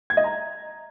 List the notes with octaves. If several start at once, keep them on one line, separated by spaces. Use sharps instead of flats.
G#6
D#5
A#5